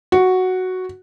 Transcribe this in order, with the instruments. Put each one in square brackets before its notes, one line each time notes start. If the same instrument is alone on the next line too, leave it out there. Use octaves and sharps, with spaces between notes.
[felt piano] F#4